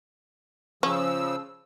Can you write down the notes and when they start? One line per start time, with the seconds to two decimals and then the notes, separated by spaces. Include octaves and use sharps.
0.83 C#3 F3 C#4 E6